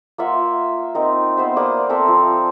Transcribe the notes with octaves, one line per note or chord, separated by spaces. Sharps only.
A#3 F4 E5 F#5
C4 D#4 A#4
B3 C5 E5
A#3 D5 D#6
C4 A4 E5 A#5
F3